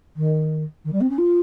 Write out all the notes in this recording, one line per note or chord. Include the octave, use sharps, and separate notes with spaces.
D#3
D#3
G3
C4
C#4
F4